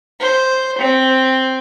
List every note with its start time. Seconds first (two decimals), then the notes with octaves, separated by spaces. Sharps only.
0.20 C5
0.79 C4